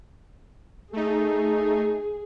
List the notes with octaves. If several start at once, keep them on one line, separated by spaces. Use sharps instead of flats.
A3 D#4 G#4